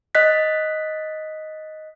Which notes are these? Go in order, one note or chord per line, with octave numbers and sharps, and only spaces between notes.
D#5 F#6 B6